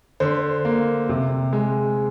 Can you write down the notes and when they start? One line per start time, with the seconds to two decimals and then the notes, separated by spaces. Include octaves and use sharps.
0.20 D3 C5
0.65 A#3
1.09 C3
1.53 G#3